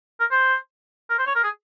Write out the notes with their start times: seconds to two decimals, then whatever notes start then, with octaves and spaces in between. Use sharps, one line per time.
0.20 A#4
0.31 C5
1.10 A#4
1.19 C5
1.27 C#5
1.35 A#4
1.43 G#4